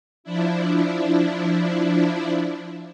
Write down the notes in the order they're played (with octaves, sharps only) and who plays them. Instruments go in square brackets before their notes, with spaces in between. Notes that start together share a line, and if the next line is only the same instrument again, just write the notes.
[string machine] F3 D4 E4